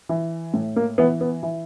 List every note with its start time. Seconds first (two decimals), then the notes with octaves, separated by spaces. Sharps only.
0.09 E3
0.54 A2
0.76 A#3
0.98 E3 B3
1.21 B3
1.43 E3